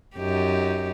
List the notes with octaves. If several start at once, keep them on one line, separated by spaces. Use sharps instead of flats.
F#2 D#4 G4